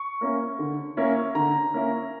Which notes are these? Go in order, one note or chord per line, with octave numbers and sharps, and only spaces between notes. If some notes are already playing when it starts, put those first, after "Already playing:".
Already playing: C#6
A#3 C#4 E4
D3
A#3 C#4 E4
D3 A#5
A#3 C#4 E4